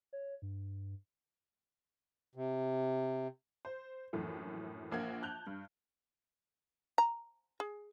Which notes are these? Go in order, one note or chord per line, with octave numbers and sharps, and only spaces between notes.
C#5
G2
C3
C5
A#1 F#2 A2 E3 A3
A#1 A#3 F#5 G#6
A5 F#6 G6 F7
G2
A#5
G#4